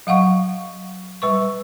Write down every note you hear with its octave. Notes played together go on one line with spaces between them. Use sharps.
F#3 F5 F#5 C#6
G3 B4 C#6